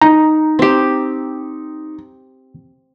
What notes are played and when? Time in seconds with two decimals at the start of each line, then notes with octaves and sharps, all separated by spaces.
0.02 D#4 A#5
0.59 C4 G4